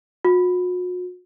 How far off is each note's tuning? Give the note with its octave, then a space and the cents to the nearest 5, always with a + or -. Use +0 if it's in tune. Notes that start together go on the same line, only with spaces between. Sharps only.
F#4 -40